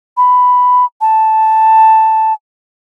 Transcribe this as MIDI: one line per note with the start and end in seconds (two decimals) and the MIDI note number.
0.17 0.85 83
1.01 2.33 81